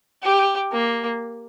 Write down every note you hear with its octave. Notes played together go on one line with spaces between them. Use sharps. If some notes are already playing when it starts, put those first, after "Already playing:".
G4
A#3